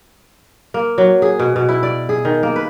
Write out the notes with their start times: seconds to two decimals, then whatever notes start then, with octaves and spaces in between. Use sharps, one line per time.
0.74 A#3
0.98 F#3
1.22 G#4
1.39 B2
1.56 B2
1.69 E4
1.83 D5
2.09 G#4
2.25 D#3
2.43 A#3
2.56 B4